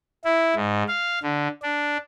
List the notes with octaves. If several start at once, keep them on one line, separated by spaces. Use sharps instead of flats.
E4
G#2
F5
D3
D4